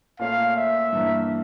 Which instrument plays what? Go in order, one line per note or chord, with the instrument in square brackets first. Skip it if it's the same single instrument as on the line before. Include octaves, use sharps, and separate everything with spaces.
[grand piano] A#2 A3 C#4 [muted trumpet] F5
[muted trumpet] E5
[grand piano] G2 E3 A#3